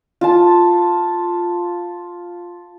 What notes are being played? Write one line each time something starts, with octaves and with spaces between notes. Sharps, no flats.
F4 A5